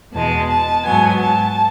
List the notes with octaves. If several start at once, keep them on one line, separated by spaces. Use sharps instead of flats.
E2 B2 G#3 A5
A5
G#2 F#3 B3 G#5
A5